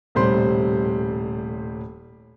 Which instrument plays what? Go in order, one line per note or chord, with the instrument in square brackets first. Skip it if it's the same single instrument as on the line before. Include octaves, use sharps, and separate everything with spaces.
[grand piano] D#1 A2 C3 G3 C5 C6